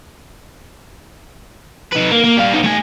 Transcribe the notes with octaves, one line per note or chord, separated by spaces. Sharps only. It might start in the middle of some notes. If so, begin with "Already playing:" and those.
D#4 B4
A#3
A#3
G3 F5
B3 D#4
A3 G#5